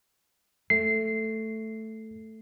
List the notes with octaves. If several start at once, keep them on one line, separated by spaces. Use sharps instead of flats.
A3 C7